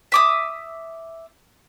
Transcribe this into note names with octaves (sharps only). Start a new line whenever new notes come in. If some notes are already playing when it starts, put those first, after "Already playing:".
E5 D6 D#6